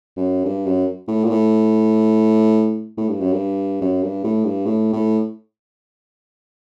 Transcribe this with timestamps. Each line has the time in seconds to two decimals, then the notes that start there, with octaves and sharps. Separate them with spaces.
0.17 F#2
0.45 G2
0.66 F#2
1.08 A2
1.24 A#2
1.30 A2
2.97 A2
3.09 G2
3.21 F#2
3.32 G2
3.81 F#2
4.03 G2
4.24 A2
4.45 G2
4.66 A2
4.93 A2